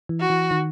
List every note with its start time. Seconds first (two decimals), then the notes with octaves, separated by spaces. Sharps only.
0.09 E3
0.20 F#4
0.30 E3
0.51 D#3